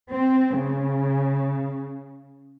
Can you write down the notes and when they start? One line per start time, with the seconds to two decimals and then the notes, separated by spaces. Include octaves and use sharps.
0.12 C4
0.58 C#3